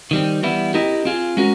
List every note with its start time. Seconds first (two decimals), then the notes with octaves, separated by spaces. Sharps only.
0.11 D#3 G3 C4
0.43 E3 G3 B3 E4
0.74 C4 E4 G4 A#4 D#5
1.05 C4 F4 G#4
1.37 G#3 C#4 F#4 A#4